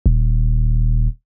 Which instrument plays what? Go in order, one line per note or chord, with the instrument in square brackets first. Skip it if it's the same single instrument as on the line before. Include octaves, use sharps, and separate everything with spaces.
[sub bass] D#1